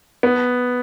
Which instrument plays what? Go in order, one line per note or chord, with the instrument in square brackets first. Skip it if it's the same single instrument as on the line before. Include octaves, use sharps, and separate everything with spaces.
[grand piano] B3